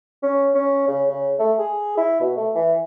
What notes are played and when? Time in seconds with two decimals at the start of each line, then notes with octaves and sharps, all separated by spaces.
0.23 C#4
0.55 C#4
0.88 C#3
1.10 C#3
1.39 A3
1.59 G#4
1.98 E4
2.21 B2
2.37 A3
2.55 E3